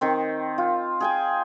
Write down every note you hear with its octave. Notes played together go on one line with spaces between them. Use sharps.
D#3 C4
F4
G#4 G5 G#5